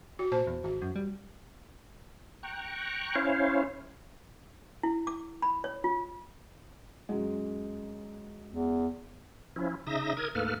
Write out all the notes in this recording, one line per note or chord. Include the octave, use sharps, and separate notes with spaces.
F#4
A#2 C5 A5
E2
G#1 F#4
F#2
G3
G5 A#5 C#6 F#6
C#4 E4 C5 C#5 F5
E4
D6
B5
C#5
F4
F#2 G#3
E2
F3 C#4 E4
C#3 D#4 E5 D#6 A#6
A#4 D#6 G#6
D2 G#2 A#3 A4 B4 F6